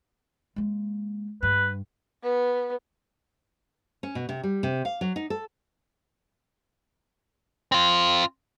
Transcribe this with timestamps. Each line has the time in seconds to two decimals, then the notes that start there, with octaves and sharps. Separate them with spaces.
0.56 G#3 A#3
1.43 G2 B4
2.23 B3
4.03 C#4
4.15 B2
4.29 C3
4.43 G3
4.63 C3
4.85 F5
5.01 F#3
5.16 D#4
5.30 A4
7.72 C4 F4